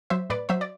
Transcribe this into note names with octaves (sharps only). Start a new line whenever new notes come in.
F#3 C5 E5
A2 B4 D5
F#3 C5 E5
D5